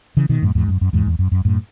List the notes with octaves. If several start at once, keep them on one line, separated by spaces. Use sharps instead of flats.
C#3 E3
B2 D#3
F#2 A2
E2 G#2
F#2
F#2
E2 G#2
E2
F#2
F#2
F#2 A2